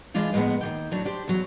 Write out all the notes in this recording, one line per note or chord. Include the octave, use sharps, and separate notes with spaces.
E3 G#3 D4 F4 F5
F2 A2 G#3 A#3 B3
D#2 E3 G5
A2 F#3 D4
D4 G4 C5
E2 F#3